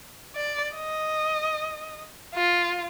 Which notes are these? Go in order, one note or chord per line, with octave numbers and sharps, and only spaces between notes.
D5
D#5
F4